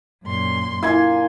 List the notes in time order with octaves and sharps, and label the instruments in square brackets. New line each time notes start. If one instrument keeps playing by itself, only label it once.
[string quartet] F#2 A#2 C6
[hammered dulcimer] A#2 G#5 C6 [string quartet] D4 [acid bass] E4